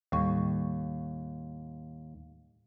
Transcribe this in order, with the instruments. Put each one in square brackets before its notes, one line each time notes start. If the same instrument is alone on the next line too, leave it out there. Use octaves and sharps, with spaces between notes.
[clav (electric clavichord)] D#2 [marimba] A2 G3 C#6